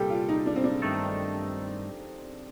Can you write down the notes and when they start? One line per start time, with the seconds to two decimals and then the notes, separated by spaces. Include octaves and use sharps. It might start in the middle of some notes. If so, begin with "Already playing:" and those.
Already playing: C2 A#2 G3 G4 A4
0.10 F4
0.29 D#4
0.46 D4
0.56 C4
0.64 D4
0.82 G2 D#3 A3 D#4 A4